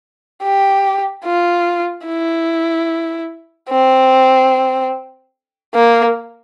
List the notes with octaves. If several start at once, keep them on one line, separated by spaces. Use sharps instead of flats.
G4
F4
E4
C4
A#3